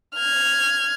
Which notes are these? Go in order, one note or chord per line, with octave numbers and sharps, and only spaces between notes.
F6 G#6